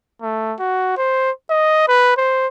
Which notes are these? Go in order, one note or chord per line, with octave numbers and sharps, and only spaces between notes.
A3
F#4
C5
D#5
B4
C5